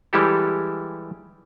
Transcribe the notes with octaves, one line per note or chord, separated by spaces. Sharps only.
E3 G3 G#3 E4 G4 A4